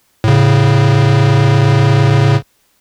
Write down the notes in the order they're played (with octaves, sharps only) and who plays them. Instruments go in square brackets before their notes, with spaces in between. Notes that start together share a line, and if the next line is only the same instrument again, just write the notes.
[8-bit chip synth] A2 C#3